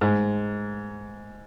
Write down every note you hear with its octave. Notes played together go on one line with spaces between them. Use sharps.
G#2